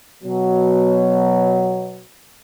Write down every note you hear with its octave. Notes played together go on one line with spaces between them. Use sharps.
B2 F#3